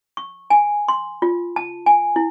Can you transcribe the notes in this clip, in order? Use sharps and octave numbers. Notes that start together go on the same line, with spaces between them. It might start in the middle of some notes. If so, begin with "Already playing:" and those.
C#6
G#5
C6
F4
A5
G#5
E4